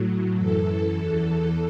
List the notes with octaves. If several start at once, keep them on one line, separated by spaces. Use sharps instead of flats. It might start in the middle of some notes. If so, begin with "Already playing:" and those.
Already playing: A2 F#3
F#2 E3 A4
E2 E3